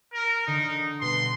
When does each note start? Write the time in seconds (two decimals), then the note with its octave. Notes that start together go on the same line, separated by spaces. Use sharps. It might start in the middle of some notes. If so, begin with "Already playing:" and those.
0.13 A#4
0.47 D3 D#4
1.01 B2 G3 B3 C6